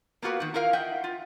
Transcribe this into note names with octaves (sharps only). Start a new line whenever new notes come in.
A#3 B3 F4 F#4 A#4 B4
D#3 F#4
E4 F4 A#4 F5
D#5 E5 F#5 G5
F4